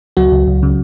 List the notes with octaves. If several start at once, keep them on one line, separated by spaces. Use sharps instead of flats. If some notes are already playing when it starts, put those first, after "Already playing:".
C#2 F#3 F#4
C#2
C#2
C#3